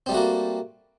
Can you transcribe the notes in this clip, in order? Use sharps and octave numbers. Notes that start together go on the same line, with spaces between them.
G3 A3 A#3 C4 F#4